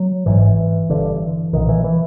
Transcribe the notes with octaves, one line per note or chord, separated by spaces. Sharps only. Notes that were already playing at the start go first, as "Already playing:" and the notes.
Already playing: F#3
G#1 G#2 E3
G1 G2 D3
B1 A#2 D#3
E3
E3